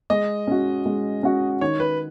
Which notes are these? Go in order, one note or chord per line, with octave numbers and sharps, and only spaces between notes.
G#3 D#5
C#4 F#4
G#3
C#4 F#4
D#3 C#5
B4